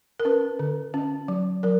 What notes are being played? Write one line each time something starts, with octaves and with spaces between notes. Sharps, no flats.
A#4
C#4 B4
D3
C#4
F#3
F#3 A#4